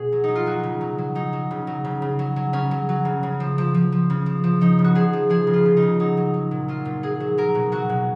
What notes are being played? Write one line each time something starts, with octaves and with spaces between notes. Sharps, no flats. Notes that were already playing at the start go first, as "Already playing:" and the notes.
Already playing: B2 G#4
F#3
F#3 D#4
F4
F#3 F#4
C#3
F#3
F#3
F#3 D#4
F#3
C#3
F#3
C#3
C#3
F#3
F#3
C#3 C#4
F#3
F#3
C#3
C#3
F3
F3
F3
F3
C#3
F3
F3
F3 D#4
C#3
F#4
F3 G#4
F3
F3 G#4
C#3
F4
C#3
D#4
C#3
F#3 D#4
F#3
F#3
A#2
F#3 F4
A#2
F#3 G#4
F#3
F#3 A#4
B2
F#3 F#4
B2